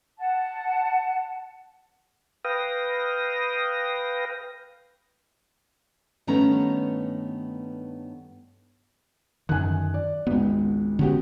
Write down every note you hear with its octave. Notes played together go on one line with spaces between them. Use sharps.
F#5 A5
B4 F5 G5 D#6 A#6
G2 D#3 A3 B3 C#4 A#5
F#2 D3 D#3 G#5 F#6
D5
G#1 C#2 B3
D3 G#3 B3 C#4 F#4 G4